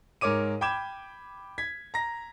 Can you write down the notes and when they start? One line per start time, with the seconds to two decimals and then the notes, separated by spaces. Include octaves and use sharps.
0.21 G#2 A#4 C#5 D6 D#7
0.61 G5 B5 D6 G6 G#6 E7
1.58 G#6 B6
1.94 A#5 A#6